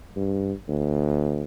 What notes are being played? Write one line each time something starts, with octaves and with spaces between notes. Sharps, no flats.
G2
D2